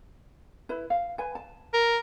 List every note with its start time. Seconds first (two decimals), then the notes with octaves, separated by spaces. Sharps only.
0.69 E4 B4
0.90 F5
1.18 B4 G#5
1.35 A5
1.73 A#4